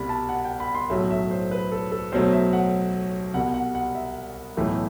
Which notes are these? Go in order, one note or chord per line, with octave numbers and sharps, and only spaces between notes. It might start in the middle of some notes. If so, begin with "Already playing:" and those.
Already playing: C2 B2 G3 B5
A5
F#5
G5
B5
C6
B1 A2 F#3 A3 E5
E5
C5
B4
A4
A4
B1 B2 F#3 A3 C5
E5
F#5
C2 B2 G3 F#5
F#5
F#5
E5
B1 A2 E3 A3